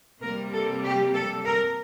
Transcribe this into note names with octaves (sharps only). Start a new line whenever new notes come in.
C3 G3 A#3 A#4
A4
G4
A4
A#4